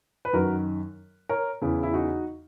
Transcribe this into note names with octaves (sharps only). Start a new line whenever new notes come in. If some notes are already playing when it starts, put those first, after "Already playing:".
B4
F#2 D#3 F#4 A#4
A#4 C#5
E2 C#3 E3
E4
D#4 F#4